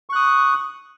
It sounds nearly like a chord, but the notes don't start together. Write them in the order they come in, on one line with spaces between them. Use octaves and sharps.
C#6 F#6 D#6